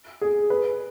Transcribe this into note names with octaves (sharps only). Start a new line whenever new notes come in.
G#4
B4